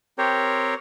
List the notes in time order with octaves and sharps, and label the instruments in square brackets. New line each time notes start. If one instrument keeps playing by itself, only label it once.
[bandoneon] C4 G4 A#4 C5 C#5